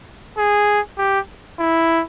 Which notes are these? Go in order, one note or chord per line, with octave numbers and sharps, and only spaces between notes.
G#4
G4
E4